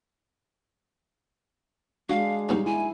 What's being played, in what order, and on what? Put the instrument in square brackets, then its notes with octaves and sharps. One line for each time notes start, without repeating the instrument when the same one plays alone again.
[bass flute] G#3 [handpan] D4 [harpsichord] F#4 [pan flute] F5
[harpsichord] G2 B2 C#4 [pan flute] D#4
[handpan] E4 [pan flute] G#5